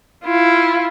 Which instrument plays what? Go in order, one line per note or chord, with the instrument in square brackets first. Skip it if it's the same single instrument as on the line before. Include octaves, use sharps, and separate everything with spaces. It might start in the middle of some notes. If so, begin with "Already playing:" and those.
[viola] E4 F4